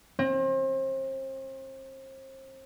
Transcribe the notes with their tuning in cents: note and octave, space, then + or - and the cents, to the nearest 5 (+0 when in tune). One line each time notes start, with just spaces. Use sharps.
C4 +35